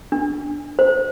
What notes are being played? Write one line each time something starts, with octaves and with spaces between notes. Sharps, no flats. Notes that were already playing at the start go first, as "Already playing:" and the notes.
D4
C5